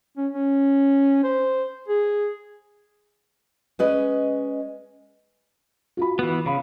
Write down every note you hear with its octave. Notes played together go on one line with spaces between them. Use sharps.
C#4
C#4
C5
G#4
G#3 C#4 B4 D5 D#5
F4 F#4 B5
E3 B3
C#3 F5 B5